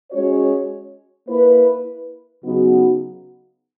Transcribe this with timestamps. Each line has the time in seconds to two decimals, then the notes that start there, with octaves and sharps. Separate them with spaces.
0.11 G#3 C#4 F#4 C#5
1.27 A#3 E4 B4
2.44 C#3 F#3 B3 D#4 F#4